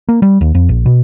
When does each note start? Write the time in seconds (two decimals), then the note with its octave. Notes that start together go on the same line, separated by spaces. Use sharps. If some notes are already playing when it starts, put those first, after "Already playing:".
0.09 A#3
0.22 G3
0.41 D#2
0.55 F2
0.69 A#1
0.86 B2